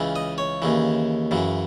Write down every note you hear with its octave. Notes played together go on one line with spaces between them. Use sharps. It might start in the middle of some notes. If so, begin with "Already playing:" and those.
Already playing: C#2 C#3 E3
D#5
C#5
D#2 C#3 E3
F#2 C#3 E3